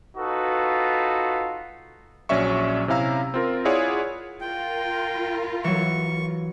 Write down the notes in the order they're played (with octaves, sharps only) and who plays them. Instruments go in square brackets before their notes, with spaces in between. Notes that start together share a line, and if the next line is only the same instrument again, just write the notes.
[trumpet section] D#4 F4 F#4 A4 B4
[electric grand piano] A#1 F#3 C#4 D5 E5 C#6
C3 C#4 E4 F5 A#5 E6
C4 F4 A#4
E4 F4 G#4 C#5 D5 F#5
[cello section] F4 A#4 [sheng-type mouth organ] G5
[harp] E3 F#3 [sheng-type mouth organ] C#6